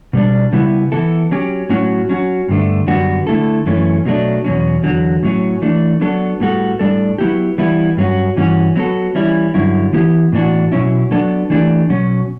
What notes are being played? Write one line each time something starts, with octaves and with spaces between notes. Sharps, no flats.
B2 G3 D4
C#3 G3 B3 E4
E3 B3 E4 A4
F#3 C#4 G4
A2 F#3 C#4 F#4
F#3 C#4 F#4
G2 D3 A3
F#2 D3 G3 B3 F#4
D3 A3 E4 A4
F#2 E3 A3 C#4
B2 F#3 A3 D4
E2 B2 F#3 C#4
E2 D3 F#3
A2 F#3 C#4
E3 A3 D4
F#3 B3 D4 F#4 A4
A2 G3 B3 F#4 A4
A2 G3 D4 A4
F#3 B3 E4 G4
E3 G3 B3 E4
G2 F#3 A3 C#4 F#4
G2 E3 C#4 F#4
F#3 B3 F#4 A4
E3 G3 C#4 E4
G2 D3 F#3 C#4 E4
E3 B3 E4 G4
A2 E3 B3 D4 F#4
B2 F#3 C#4 E4
F#3 B3 D4 A4
E3 A3 D4 G4
B2 F#3 C#4